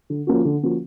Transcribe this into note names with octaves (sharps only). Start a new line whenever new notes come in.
D3
F3 A#3 C#4 F#4
D3
F3 A#3 C#4 F#4